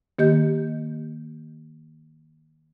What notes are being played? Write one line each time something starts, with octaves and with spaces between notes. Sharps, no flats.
D#3 A#3 G4 D#5 G6